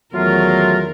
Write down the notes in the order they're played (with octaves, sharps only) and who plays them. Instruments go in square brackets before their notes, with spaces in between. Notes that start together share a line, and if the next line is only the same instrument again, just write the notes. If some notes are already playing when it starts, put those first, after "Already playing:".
[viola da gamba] E2 D#3 A#4 [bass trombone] F#3 [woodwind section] A3 F4